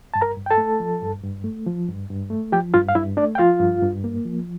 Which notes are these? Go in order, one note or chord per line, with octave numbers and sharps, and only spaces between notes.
G2 A5
A#4 A#5
G2
G5
A4 A5
A3
F3
G2
G2
A3
F3
G2
G2
A3
F3 G4 G5
G2 F4 F5
F5
G2 E4 E5
A3 D4 D5
G5
F3 F4 F5
G2
G2
A#3
F3